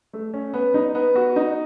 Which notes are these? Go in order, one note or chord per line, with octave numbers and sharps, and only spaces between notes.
A3
C#4
B3
D#4
B3
F#4
D#4